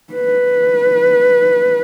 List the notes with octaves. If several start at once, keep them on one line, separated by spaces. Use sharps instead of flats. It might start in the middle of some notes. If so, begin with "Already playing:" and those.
B4